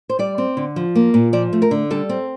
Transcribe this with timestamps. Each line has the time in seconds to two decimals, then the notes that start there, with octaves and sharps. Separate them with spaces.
0.09 C5
0.19 G3 D5
0.38 C4
0.57 D3
0.76 F3
0.95 A#3
1.14 A#2
1.33 F3 D5
1.53 A3
1.62 A#4
1.71 D3
1.90 G3 A4
2.09 C4